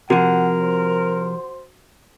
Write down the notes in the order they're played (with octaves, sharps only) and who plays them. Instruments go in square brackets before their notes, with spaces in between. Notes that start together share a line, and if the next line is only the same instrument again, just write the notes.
[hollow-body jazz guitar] C3 F3 [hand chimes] F#4 [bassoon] A#4 [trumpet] F#5
[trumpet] C5